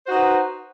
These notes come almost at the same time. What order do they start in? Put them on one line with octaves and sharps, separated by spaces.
C5 F#4 D#4 B4